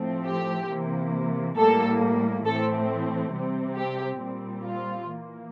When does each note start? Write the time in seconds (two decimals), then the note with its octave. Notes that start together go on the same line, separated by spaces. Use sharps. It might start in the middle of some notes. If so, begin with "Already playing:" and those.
Already playing: A2 F3 A3 C4
0.25 G4
0.69 C3 E3 A#3
1.57 A2 G3 A#3 A4
2.44 A2 E3 A3 C4 A4
3.32 C3 G3 C4
3.76 G4
4.19 A#2 G3 C4
4.63 F4
5.08 E3 A#3